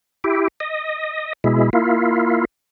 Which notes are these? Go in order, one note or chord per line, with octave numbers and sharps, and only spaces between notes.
E4 G4
D#5
B2 G#3 E4
A#3 E4 F4